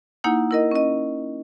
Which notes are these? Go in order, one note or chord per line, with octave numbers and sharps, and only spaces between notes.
A#3 D#4 E4 F#5 G#5 G6
E4 A#4 D#5
C#4 D#5